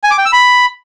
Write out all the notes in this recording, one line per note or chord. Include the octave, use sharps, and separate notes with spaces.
G#5
D6
G5
E6
B5